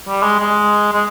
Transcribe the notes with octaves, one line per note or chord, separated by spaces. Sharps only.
G3
G#3
G#3
G#3